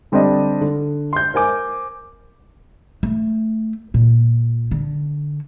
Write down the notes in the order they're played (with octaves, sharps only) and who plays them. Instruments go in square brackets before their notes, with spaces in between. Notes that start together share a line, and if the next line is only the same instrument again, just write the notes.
[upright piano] D3 G3 C4 D4 D5 D#5
D3
C6 G6
A#4 C5 G#5 D6
[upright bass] A3
A#2
D3